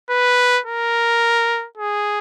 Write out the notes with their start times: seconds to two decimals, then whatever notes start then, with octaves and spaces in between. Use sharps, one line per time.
0.10 B4
0.66 A#4
1.77 G#4